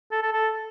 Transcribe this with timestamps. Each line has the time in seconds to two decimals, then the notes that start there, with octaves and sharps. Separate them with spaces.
0.12 A4
0.22 A4
0.33 A4